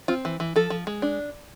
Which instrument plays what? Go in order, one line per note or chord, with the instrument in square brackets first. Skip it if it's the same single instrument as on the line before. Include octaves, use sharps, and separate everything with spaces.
[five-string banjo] C4 F4
E3
E3
F3 A4
F3
G#3
D4